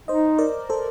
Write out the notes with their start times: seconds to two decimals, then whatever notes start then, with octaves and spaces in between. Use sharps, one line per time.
0.08 D#4 C5 D#5
0.38 A#4 D5
0.70 A4 C5